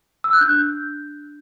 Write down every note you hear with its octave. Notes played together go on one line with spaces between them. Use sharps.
E6
F#6
D4 G6